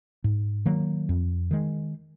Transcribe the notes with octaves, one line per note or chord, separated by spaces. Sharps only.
G#2
D#3 F#3 A#3
F2
D#3 G#3